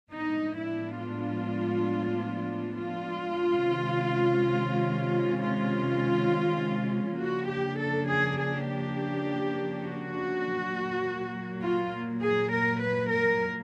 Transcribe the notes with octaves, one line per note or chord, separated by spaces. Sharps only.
A2 F3 G#3 B3 D4 D#4
E4
F4
F4
C3 D#3 G#3 C#4
F4
C#3 F3 A#3 D4 F#4
G4
A4
G#4
G#4
G4
F#4
A#2 F#3 A#3
F4
G#4
A#4
B4
A#4